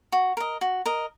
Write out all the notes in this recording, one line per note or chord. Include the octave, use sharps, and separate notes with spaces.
F#4
A#4 D#5
F#4
A#4 D#5